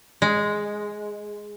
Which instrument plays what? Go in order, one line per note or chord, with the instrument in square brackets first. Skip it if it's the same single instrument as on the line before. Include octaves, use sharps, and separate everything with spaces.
[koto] G#3